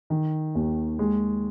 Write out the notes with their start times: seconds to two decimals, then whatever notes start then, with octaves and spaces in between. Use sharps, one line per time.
0.10 D#3
0.55 D#2
0.99 G#3